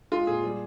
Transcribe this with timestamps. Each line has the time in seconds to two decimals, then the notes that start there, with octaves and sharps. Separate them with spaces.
0.12 G#3 F4
0.27 A#2 G#4
0.44 G3